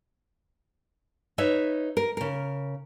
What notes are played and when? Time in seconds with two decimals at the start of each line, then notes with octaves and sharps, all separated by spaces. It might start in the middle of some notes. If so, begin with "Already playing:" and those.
1.38 D#4 B4 C#5 E5
1.97 A#4
2.17 C#3 A#4